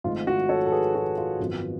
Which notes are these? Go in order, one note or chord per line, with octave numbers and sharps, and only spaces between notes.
G#1 G#2 F3 A3 F4
F#4
A4 C#5
A4
G#4 B4
F#4
F4
G#1 F#2 F3 B3